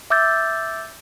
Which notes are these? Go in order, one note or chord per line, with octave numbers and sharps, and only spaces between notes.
E5 D6 E6 G6 A6